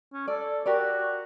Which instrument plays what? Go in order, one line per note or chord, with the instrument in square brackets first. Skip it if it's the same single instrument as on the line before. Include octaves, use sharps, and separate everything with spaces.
[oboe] C#4
[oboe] A4 [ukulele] D5
[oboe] F#4 [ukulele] G4 A#4 D5